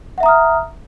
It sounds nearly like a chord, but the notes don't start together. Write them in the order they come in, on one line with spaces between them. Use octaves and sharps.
F#5 E5 A#5 D#6 F6